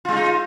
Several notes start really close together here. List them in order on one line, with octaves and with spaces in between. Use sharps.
F4 G#3 D#4